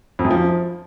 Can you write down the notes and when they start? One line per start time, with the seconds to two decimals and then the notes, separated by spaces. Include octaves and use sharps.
0.19 F2
0.25 F#2
0.31 F3